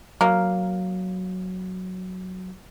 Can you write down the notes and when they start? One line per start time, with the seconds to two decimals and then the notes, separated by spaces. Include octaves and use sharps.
0.21 F#3 A#3